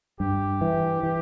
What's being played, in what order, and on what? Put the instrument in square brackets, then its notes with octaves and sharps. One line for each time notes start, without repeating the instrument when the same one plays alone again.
[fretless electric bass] G2 [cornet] G4
[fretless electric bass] E3
E3